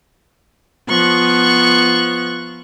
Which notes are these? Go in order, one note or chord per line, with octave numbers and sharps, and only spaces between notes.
F3 B3 C#6 F#6